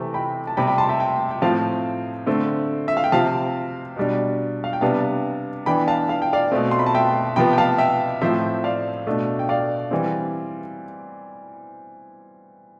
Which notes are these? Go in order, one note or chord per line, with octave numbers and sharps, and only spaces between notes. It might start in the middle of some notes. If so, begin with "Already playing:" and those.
Already playing: C3 E3 A3 C4
G5 B5
A5
C3 G3 C4 G5 B5
G5 B5
A5 C6
E5 G5
E5 G5
G5
A2 F3 C4 F5 A5
D3 A3 C4
E5
F5
G5
C3 F3 C4 F5 A5
B2 G3 D4
F5
G5
C3 G3 B3 D4 F5 A5
E3 B3 D4 G5 B5
F5 A5
F5
G5
D5 F5
B2 A3 C4
C6
B5
A5
E5 G5
C3 F3 B3 G5 B5
G5
F5 A5
E5 G5
A2 F3 C4 C5 E5
D5 F5
B2 A3 D4
G5
D5 F5
E3 G3 C4